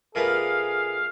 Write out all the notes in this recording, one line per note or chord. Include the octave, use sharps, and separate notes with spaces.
A#2 A3 B3 G#4 F5